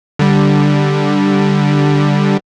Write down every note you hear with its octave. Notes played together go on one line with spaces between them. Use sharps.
D3 G3